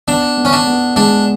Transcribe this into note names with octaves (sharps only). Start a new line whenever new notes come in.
B3 D4
B3
C#4
D4
B3
G#3 D4